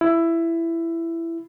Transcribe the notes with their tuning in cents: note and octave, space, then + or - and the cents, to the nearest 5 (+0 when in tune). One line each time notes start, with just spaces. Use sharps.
E4 +15